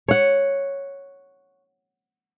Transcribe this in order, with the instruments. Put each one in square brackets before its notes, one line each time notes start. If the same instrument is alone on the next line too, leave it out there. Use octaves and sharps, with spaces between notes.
[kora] C#5 F#5